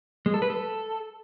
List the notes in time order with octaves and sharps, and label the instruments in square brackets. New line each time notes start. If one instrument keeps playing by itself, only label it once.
[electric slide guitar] G#3
A4
B4
A4